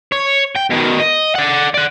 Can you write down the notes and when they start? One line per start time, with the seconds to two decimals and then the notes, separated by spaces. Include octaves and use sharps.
0.12 C#5
0.56 G5
0.71 B2 D#3
1.00 D#5
1.35 D5 F#5
1.74 D5 F#5